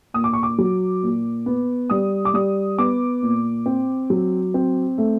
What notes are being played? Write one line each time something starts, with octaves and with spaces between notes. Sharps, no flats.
A#2 D#6
D6
C#6
D6
F#3
A#2
B3
G3 D#6
D6
G3 D#6
B3 D6
A#2
C4
F#3
C4
A3